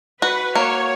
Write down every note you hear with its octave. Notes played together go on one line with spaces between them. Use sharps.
F#4 B4
A#3 C#5